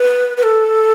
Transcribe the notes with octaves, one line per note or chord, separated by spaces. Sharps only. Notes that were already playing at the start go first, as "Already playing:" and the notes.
Already playing: B4
B4
A4